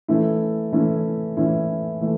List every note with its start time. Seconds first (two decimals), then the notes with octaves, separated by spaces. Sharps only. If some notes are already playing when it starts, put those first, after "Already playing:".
0.08 E3 A3 C#4 E4
0.73 E3 A3 C#4 E4
1.37 E3 A3 C#4 E4
2.01 E3 A3